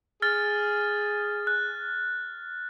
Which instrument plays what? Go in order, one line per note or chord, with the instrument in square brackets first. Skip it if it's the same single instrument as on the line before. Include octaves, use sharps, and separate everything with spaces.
[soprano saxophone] G#4 [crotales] F6 A6
[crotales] F#6